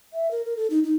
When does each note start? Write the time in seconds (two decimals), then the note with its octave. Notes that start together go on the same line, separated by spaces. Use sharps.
0.13 E5
0.31 A#4
0.45 A#4
0.57 A4
0.70 D#4
0.84 D#4